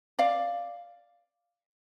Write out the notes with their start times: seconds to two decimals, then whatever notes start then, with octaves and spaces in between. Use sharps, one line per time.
0.19 D5 F5